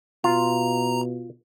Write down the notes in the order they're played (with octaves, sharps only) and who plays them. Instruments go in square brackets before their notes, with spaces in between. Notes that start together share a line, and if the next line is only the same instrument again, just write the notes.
[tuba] B2 [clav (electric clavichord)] F4 [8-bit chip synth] A#5